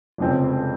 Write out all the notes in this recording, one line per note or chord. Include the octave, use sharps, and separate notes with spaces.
F1 F2 C#3 G#3 C4